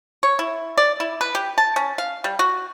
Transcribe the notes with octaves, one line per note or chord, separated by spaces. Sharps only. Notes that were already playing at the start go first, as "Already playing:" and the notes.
C#5
E4
D5
E4
B4
G4
A5
C#4
F5
G3
F#4